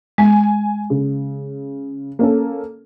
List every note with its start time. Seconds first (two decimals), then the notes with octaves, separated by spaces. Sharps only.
0.18 G#3 G#5
0.90 C#3
2.19 A#3 C#4 A4